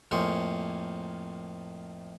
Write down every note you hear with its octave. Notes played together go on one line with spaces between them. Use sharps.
F2 A2 A#3 G#4 C5 C#5